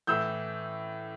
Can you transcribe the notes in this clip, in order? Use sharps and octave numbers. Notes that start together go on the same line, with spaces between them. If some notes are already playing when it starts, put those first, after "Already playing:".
A2 E3 E6 G6